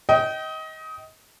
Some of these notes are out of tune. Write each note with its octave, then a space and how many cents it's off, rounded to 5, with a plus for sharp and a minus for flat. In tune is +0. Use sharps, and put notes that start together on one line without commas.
D#5 +25 G5 -25